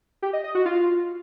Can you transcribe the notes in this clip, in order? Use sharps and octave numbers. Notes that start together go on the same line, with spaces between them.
G4
D#5
D#5
F#4
F4